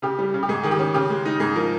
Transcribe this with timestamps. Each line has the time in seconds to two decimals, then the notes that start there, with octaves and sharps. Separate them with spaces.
0.02 C#3 G4
0.19 G3
0.34 C#3
0.43 G4
0.49 G#2 G#4
0.63 D#3 G#4
0.71 G4
0.79 C#4
0.94 C#3 G4
1.10 G#3
1.25 D#4
1.40 G#2 G#4
1.56 F3 A#4